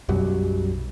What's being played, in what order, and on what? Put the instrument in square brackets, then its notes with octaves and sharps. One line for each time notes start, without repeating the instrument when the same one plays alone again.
[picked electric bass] B1 F#2 F#3 G3